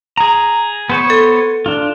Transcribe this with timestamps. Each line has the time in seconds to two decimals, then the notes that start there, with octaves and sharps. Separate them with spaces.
0.18 G#4 A#5
0.90 B3 C5 C#5
1.10 A4
1.66 D4 F4